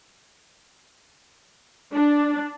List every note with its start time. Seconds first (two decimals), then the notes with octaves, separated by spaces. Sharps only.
1.92 D4